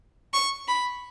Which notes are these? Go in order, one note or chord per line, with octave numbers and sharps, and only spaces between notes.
C#6
B5